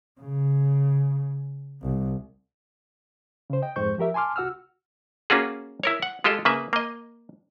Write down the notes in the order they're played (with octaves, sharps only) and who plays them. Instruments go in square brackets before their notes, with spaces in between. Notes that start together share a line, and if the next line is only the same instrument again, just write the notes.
[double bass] C#3
C2
[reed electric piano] C#3 C5
D#5 G5
F2 G#2 C5 C#6 G6
F3 G4 A#4 E5
G#5 A5 C6 D6 F6
C2 F#4 F#5 E6 F6
[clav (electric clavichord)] A#3 C#4 F4 F#4 G#4
E4 A#4 C#5
F#5
G#3 F4 G4 A4 D#5
C#3 A#3 B4 E5
A#3 D#5